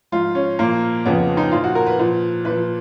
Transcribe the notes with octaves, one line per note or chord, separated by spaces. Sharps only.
G#2 F3 F4
C#4
A#2 F3 A#3
F2 C#3 F3 B3
D#4
A#2 F3 F4
F#4
A#4
B4
A#2 F3
A#2 F3 B4